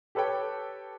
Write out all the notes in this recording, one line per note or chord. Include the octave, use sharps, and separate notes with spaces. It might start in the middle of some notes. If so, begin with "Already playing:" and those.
G4 A4 B4 C#5 G5